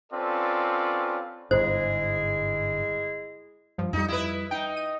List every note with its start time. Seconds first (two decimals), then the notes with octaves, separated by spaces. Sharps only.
0.13 C4 C#4 F4 A4 B4 D5
1.51 G1 G#2 G#3 E4 G#4 C5
3.78 G2 F3
3.93 F2 G3 D#4
4.08 E4 B4
4.51 D#4 G5
4.76 D#7